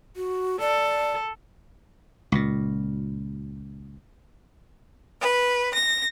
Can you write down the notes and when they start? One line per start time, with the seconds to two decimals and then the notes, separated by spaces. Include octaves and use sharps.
0.16 F#4
0.60 A4 D5
2.32 C#2 A#2
5.20 B4
5.73 A#6